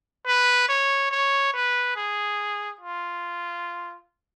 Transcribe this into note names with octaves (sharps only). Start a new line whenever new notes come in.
B4
C#5
C#5
B4
G#4
F4